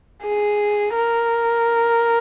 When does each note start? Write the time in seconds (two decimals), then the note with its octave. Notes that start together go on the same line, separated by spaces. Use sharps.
0.23 G#4
0.95 A#4